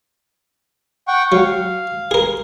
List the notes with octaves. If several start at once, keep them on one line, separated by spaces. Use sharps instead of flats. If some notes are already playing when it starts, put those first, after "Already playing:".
F#5 G5 C#6
F#3 F5
G#4 A#4